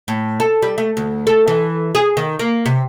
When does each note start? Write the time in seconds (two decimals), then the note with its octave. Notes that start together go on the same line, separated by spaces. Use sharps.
0.08 A2
0.40 A4
0.62 G3
0.78 A3
0.97 D2
1.27 A4
1.48 E3
1.95 G#4
2.17 D#3
2.39 A#3
2.66 C3